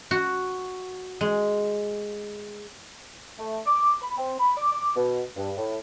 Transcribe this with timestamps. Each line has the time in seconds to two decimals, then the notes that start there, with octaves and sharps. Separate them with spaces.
0.11 F#4
1.21 G#3
3.39 A3
3.66 D6
4.02 B5
4.18 C4
4.40 B5
4.57 D6
4.72 D6
4.96 B2
5.37 G2
5.57 A2